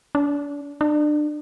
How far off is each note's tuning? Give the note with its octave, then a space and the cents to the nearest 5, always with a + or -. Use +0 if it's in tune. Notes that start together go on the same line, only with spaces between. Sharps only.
D4 -35
D4 +30